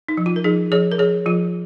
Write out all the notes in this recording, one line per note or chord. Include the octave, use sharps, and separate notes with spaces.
D#4
F3
F4
A#4
F3 D#4 G#4
F3 G#4 C#5
A#4
F3 G#4 C#5
F3 F4